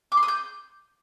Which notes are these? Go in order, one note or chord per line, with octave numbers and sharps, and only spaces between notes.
D6
C6
D#6
G6